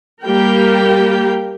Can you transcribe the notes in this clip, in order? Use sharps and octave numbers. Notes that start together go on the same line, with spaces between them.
G3 A#3 G4 A#4 G5